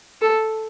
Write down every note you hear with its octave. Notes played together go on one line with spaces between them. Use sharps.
A4